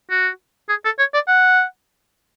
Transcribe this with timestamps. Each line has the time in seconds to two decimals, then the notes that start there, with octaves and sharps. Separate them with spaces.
0.10 F#4
0.69 G#4
0.85 A4
0.99 C#5
1.14 D5
1.28 F#5